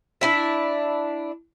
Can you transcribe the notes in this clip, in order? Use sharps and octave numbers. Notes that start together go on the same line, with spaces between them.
D4 E4 E5